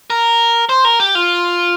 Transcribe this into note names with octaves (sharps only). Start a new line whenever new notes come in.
A#4
C5
A#4
G4
F4